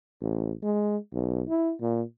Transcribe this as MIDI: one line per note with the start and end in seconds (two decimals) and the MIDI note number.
0.21 0.53 33
0.63 0.97 56
1.14 1.44 35
1.49 1.73 64
1.81 2.02 46